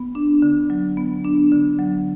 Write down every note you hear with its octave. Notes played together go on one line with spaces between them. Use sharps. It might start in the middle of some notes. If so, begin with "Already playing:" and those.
Already playing: B3
D4
D3
F#3
B3
D4
D3
F#3